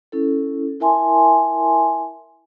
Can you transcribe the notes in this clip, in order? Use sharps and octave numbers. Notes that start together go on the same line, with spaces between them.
C#4 E4 A4
E4 A#4 E5 G#5 A5 C6